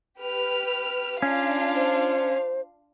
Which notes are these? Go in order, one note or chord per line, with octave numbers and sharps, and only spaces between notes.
G4 B4 F6
C#4 D4 F4 F5
C5